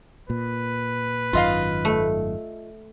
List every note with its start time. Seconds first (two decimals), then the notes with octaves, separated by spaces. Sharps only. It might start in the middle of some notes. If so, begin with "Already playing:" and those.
0.30 A#2 B4
1.33 G#1 F#2 D#3 F4 D#5 F5
1.85 A3